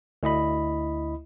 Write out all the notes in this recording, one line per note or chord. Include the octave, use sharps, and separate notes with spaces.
D2 E4 D#5 B5